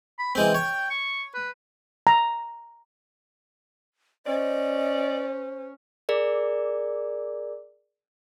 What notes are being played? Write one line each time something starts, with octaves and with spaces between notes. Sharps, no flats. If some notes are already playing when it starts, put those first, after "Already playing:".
B5
E3 G#3 C4 G5
C#5
C#6
B4
A#5
C#4 C5 D5 D#5
G#4 A#4 D5